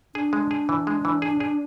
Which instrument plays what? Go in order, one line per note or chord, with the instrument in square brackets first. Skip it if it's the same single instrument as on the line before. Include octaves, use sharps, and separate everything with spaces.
[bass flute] D4 [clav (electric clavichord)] G#4
[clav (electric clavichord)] G#3
G#4
E3
G#3
E3
G#4
G#4